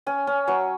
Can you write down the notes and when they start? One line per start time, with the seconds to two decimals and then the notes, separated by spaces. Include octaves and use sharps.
0.06 C#4 G#5
0.27 C#4
0.47 F#3 C#6